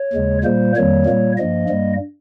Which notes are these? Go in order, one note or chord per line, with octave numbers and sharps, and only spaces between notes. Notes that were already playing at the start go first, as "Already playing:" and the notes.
Already playing: C#5
D#2 C#3 G#3
A#2 G3 A#3 C5
F2 D#3 G3 A#3 C#5
A#2 G3 A#3
G2 F3 A#3 D#5
G2 G3 A#3